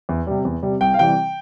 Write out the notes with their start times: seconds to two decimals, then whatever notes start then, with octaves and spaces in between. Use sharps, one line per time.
0.09 E2
0.27 C3 G3
0.45 E2
0.63 C3 G3
0.81 C2 G5
0.94 F5
0.99 C3 E3 G3 G5